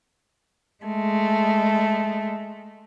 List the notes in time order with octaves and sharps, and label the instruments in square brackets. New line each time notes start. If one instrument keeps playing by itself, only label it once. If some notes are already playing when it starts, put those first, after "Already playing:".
[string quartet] G#3 A3